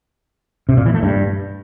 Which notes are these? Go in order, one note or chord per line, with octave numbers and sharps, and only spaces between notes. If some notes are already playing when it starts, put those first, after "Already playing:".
C3
A#2
E3
A3
G2